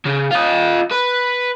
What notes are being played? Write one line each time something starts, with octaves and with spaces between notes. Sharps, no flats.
C#3
F4 D#5
B4